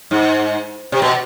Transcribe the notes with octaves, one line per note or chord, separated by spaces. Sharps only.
G#2
C3
B2